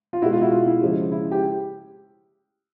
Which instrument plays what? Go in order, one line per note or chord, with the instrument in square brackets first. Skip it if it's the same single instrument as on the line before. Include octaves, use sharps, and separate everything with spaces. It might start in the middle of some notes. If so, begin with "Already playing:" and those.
[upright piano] F4
B2 G#3 E4 F#4
F4
E4 F#4
F4
E4
C#3 F3 G#3
E4
G4